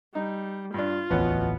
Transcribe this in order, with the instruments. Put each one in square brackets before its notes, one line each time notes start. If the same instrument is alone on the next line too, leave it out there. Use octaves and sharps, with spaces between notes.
[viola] G3 [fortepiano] D#4
[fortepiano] G2 D4 [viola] F4
[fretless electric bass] D1 A1 E2 [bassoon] B2 [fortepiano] F3 B3 C#4